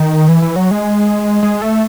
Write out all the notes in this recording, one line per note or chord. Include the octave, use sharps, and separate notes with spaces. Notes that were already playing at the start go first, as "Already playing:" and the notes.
Already playing: D#3
E3
E3
F#3
G#3
G#3
A3